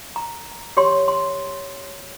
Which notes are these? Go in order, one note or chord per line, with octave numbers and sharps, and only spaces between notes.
A#5
G4 C#5 C6
C6